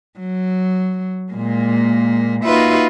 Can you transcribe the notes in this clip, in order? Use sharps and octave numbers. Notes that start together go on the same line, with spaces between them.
F#3
A#2 G#3 A#3
A#3 D#4 F4 F#4 B4 E5